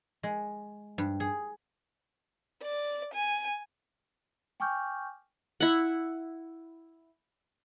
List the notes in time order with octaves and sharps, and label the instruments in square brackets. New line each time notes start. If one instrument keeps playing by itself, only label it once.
[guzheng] G#3
G2
G#4
[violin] D5
G#5
[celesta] G5 G#5 C#6 D6 F6 G6
[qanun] E4 F#5